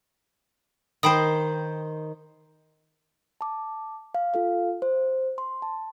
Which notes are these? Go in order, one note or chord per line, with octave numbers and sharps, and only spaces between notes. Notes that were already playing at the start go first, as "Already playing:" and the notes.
D#3 C5 G5 B5 D#6
A5 D6
F5
F4 A4 F5
C5
C6
A5